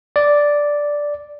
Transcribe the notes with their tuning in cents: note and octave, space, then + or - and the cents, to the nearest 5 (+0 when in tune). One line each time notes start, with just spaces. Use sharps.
D5 -5